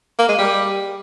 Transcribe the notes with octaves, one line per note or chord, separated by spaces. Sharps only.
A#3
G#3
G3